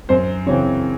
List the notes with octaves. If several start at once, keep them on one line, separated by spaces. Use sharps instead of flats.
F#2 C5
C#3 E3 C4 C#5